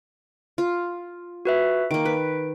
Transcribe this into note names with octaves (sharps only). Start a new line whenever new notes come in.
F4
F#4 B4 E5
D#3 A#3 D7
B4